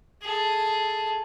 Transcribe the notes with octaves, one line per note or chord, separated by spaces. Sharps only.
G#4 A4